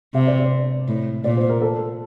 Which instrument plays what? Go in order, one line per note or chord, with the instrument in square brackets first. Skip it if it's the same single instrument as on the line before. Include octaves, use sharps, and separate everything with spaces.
[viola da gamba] C3 [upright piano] E5
[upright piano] D5
D5
[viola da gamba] A2
[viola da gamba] A#2 [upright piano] D5
[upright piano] C5
A#4
A4